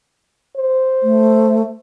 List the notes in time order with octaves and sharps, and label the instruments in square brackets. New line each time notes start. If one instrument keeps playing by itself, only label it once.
[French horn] C5
[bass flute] A3